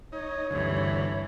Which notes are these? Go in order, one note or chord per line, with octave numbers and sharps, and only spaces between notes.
D#4 C#5
D2 G2 C3 E3